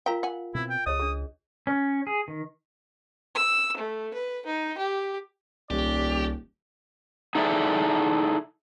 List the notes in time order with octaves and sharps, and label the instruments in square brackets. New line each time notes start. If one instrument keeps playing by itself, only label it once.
[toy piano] F4 A#4 F5 [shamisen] G5 A#5
[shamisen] F#5 G#5
[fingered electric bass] B2 C4 [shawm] E4
[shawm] G5
[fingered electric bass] C#2 [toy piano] G#4 C#5 D#5 [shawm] D#6
[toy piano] D4 G#4
[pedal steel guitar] C#4
G#4
D#3
[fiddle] E6
A3
B4
D#4
G4
[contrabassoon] D#1 [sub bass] C2 [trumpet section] C#4 D4 D5 [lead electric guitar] G4
[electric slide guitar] D#4 E4 G#4 A4 D5 E5